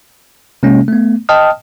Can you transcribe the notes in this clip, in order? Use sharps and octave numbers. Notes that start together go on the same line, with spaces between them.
C3 G#3 A#3 C#4
A3 B3
D#5 G5 A5 D#6 F6